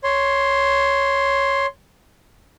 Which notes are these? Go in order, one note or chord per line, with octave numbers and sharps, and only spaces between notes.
C#5 C6